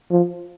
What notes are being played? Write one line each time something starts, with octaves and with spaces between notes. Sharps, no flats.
F3